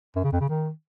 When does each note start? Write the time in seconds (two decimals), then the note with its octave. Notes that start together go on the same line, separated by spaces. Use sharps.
0.16 F#2
0.24 C#3
0.32 F2
0.41 C#3
0.49 D#3